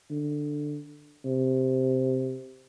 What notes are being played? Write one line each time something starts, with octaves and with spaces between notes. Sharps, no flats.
D3
C3